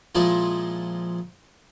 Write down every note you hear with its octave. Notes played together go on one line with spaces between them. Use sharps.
A#2 F3 G#3 E4 F4